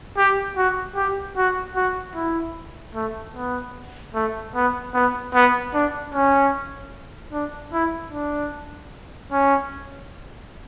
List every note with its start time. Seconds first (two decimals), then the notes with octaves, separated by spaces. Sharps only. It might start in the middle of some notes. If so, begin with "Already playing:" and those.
0.17 G4
0.57 F#4
0.96 G4
1.37 F#4
1.75 F#4
2.15 E4
2.95 A3
3.35 B3
4.14 A3
4.55 B3
4.94 B3
5.34 B3
5.74 D4
6.14 C#4
7.33 D4
7.73 E4
8.12 D4
9.32 C#4